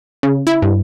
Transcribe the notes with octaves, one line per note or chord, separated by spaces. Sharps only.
C#3
E4
G2